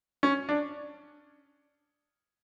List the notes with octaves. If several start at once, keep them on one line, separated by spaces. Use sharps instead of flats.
C#4
D4